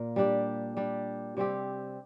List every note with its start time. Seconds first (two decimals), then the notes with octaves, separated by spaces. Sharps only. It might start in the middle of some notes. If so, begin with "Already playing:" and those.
Already playing: A#2 A#3
0.16 G3 D4 G4
0.77 G3 D4 G4
1.37 C3 G3 C4 G4